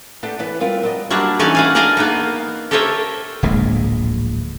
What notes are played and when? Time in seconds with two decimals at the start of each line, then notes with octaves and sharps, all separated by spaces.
0.23 A3 B3 D4 G4 A4
0.39 E3 B3 B4
0.60 G3 B3 C4 E4 F4 A#4
0.83 F#3 D4 D#5
1.10 F#3 G3 A#3 D4
1.39 E3 C#4 D#4 D5 G#5
1.55 F#4 F5 G#5
1.75 D4 G#4 A#4 D5 D#5 F5
1.97 A#3 B3 D#4
2.71 G4 A4 A#4 C5 C#5 E5
3.43 D1 A#1 A2 G#3